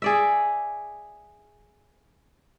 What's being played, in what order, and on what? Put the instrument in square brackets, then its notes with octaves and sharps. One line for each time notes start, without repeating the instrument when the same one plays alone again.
[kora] G#4 D5 E5